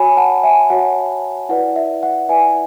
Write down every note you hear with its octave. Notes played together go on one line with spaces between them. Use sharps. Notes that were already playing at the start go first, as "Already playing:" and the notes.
Already playing: F#4 C#5 G#5 B5
F#5 A5
E5 G#5
F#4 C#5 F#5
E4 B4 D5 F#5
E5
F#5
E4 B4 D5 E5 G#5